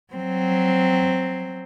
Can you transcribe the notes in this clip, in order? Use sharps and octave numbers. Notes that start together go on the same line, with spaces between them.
F#3 C4